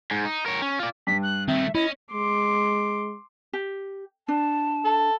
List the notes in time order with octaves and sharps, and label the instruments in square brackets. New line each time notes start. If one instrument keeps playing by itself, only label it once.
[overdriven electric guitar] G#2
D#4
A#4 C#5
C#4
F4 D5
[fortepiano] G2 [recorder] B6
[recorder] F#6
[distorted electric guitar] D#3 A3 [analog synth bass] C4 [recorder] E5
[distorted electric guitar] C#4 [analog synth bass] E4 [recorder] D#5
[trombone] G#3 [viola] C6 D6
[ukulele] G4
[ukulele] D4 [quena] A5
[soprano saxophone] A4